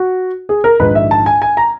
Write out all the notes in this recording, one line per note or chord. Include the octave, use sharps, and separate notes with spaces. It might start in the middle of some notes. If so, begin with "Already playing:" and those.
Already playing: F#4
G#4
A#4
A#1 G#2 D#3 B4
E5
A5
G#5
G#5
A#5